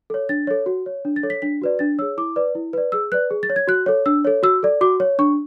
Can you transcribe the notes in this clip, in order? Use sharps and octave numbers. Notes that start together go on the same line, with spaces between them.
A4 C#5
D4 A6
A4 C#5
F#4
C#5
D4
A6
A4 C#5
B6
D4 B6
F#4 B4 D5
D4 A6
G#4 C#5 E6
E4 D6
B4 D5
E4
B4 D5
G#4 E6
B4 D5 F#6
G#4
A6
C#5
G#6
F#4 F#6
A4 C#5
D4 E6
A4 C#5
F#4 E6
A4 D5
F#4 D6
C#5
D4 C#6